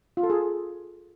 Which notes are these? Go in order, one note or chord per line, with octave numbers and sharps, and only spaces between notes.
F4
A4
G#4